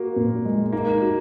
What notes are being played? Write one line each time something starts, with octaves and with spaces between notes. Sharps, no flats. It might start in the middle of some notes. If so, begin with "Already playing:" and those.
Already playing: A#3 F#4
A#2
G#3
A#3 D#4
F#4